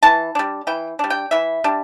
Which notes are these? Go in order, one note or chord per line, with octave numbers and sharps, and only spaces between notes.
E3 A5
G3 D4
E3 G5
G3 D4
G5
E3 E5
G3 D4